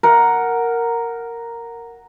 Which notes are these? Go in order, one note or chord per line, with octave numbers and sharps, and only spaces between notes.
A#4 F#5